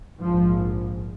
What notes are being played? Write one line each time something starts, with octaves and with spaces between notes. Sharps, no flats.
A#1 G#2 F3